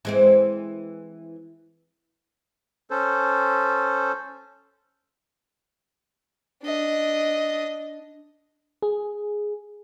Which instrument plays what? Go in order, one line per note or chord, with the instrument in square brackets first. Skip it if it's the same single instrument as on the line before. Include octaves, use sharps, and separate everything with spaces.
[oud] E3 G#3 C4
[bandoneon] C#4 A4 C5
[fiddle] D4 D#5
[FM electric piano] G#4